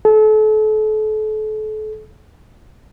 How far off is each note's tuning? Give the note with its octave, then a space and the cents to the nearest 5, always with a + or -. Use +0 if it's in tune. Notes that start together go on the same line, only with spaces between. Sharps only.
A4 -35